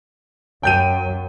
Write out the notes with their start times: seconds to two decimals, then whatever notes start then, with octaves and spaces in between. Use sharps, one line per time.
0.63 F#2 G5 G6 D#7